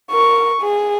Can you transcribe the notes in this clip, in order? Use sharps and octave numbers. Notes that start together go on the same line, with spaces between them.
A#4 C#6
G#4